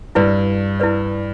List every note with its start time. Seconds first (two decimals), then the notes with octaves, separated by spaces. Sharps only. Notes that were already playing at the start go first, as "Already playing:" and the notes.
0.15 G2 E4 B4 D5
0.80 E4 B4 D5